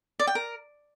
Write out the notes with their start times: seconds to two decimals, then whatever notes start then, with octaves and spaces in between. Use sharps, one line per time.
0.19 D5
0.27 G5
0.35 A#4